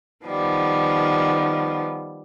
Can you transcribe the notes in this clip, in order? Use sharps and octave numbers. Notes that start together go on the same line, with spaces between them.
D#3 F3 G3 B3